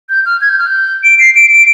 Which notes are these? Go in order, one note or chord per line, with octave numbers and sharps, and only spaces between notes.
G6
F6
G#6
G6
F6
G6
D7
C7
D7
D7